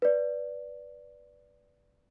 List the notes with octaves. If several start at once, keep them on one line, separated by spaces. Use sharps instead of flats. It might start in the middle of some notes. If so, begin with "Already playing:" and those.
B4 D5